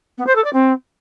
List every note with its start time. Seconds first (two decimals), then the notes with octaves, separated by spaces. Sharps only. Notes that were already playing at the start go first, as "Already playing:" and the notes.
0.18 B3
0.27 C5
0.35 A4
0.44 D5
0.53 C4